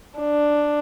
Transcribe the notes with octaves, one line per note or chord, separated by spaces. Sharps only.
D4